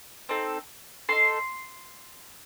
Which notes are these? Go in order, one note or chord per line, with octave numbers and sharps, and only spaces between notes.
C4 D#4 A4
D#4 A4 C6